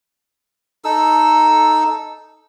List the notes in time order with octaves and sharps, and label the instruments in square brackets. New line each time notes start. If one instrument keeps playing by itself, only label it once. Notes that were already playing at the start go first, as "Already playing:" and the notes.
[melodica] D#4 A4 E6